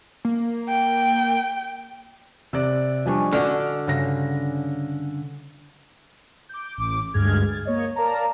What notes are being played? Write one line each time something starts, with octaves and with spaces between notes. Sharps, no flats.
A#3
G5
C3 D5 E6 F#6 D#7
F3 G3 D4 D#5 G#5 C#6
D3 D4 F#4 F6
G2 C#3 F#5 A#6
D6 G6
A1 D6
D2 G2 G#3 G#4 F6 G#6
G#6 A6
A#3 C#5 D#5
A#4 D5 F5 A5 A#5